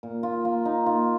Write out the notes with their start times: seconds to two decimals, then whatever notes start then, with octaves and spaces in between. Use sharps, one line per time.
0.03 A#2
0.23 F4
0.44 A#3 F4
0.65 D#4
0.86 A#3 F4